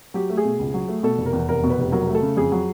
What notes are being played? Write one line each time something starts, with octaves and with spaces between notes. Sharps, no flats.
F#3 G4
A3
G#4
B2
C#2
F#3
A3
B2 A4
F1
A#4
E2
F1 A#4
B2
B4
F1
F#3 A#4
A3
A4
C#3
F2 G#4
F#3